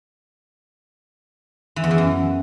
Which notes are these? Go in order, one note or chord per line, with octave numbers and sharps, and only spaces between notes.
E3
E2
E3
F#2